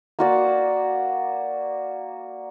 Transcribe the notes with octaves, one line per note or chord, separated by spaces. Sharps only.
A#3 F#4 D5